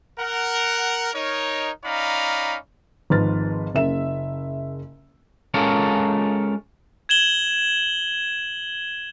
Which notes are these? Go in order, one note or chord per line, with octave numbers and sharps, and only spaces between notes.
A#4 F#5
D#4 A#4 C#5
C#4 D#4 D5 F5 A#5 B5
G#1 G#2 F3 B4 F6 A6
F#1 C#3 A#3 E5 E7
G#3 C#4 F4 A4 A#4
G#6 E7 F#7 G7